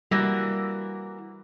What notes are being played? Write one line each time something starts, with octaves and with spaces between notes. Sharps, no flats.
E3 G3 A#3 F#4